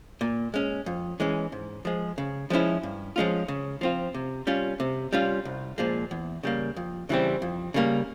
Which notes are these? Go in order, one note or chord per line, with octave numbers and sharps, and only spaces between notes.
A#2
G#3 C#4
F2
E3 G#3 C#4
G#2
F3 G#3
C#3
F3 G#3 C#4 E4
G2
F3 G#3 C#4 F4
C#3
F3 C4 F4
C3
G3 C#4 F4
C3
G3 C#4 F4
C2
A#2 F3 G#3
E2
C#3 G3 A#3
F2
C#3 E3 G3 C4
F2
C#3 G3 A#3